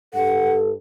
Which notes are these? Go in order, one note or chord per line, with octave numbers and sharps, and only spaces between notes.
G2 A4 F#5